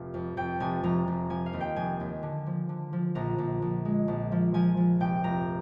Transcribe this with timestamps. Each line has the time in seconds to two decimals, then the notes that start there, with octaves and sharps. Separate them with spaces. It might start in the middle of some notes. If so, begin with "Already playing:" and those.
Already playing: F1 F5
0.14 F2
0.37 F2 G5
0.60 F1 G#5
0.84 F1 A#5
1.08 F1
1.30 F3 G#5
1.46 F5
1.53 D#2
1.61 G5
1.76 F1 G#5
2.00 D#2
2.23 D3
2.46 F3
2.69 D3
2.93 F3
3.15 A#1 A#5
3.38 A#1
3.62 A#1
3.85 G#3
4.08 A#1
4.32 F3
4.54 F3 G#5
4.77 F3
5.00 F1 G5
5.24 F1 A#5